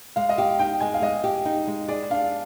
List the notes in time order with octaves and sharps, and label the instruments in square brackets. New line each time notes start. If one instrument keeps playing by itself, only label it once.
[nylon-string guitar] G#3 [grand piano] F5
[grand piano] D#5
[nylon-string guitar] G4 [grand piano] F5
[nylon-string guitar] D#4 [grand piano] G5
[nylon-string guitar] G#3 [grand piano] G#5
[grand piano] F5
[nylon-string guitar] G#3 [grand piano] D#5
[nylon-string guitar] G4
D#4
G#3
[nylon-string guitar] G#4 [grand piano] D5
[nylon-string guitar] D4 [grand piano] F5